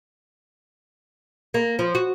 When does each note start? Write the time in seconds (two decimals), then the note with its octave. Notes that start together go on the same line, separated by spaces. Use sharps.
1.54 A#3
1.79 F3
1.95 F#4